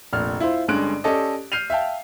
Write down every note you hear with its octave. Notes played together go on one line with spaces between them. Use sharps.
F1 A#1 F6
E4 F4 C5
G1 G2 G#3 C#4 F#6 D7
C#4 G4 A4 D5 D#5
F6 G6 C7 D#7 F7
E5 F5 G5 A5